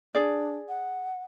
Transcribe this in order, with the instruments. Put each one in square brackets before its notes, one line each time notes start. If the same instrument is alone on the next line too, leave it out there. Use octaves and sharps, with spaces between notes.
[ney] D4 [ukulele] G#4 D5
[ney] F#5